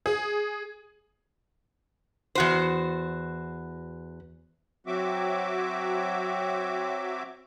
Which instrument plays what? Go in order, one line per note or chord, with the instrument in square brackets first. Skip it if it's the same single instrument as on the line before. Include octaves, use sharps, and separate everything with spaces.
[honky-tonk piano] G#4
[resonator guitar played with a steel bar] E2 F#4 C5
[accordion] F#3 C4 F#4 E5 D6